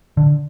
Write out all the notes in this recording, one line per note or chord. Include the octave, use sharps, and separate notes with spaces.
D3